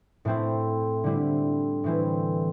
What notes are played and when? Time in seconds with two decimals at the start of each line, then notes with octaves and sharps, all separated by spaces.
0.25 A2 A3 C4 E4
1.04 D3 G3 C4 E4
1.84 A2 E3 C4 E4